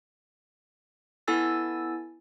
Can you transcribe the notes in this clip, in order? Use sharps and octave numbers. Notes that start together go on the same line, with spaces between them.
B3 E4 A4 G#5 E6 A6